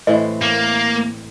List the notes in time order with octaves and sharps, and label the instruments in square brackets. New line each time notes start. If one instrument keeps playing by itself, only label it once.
[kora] A2 E3 C4 [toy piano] D#5
[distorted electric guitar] A#3